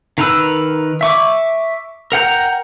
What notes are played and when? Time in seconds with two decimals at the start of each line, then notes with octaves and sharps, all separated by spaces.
0.18 D#3 A#4 B4 E6
1.01 E5 C#6 D6
2.12 A#4 F#5 G5 A#5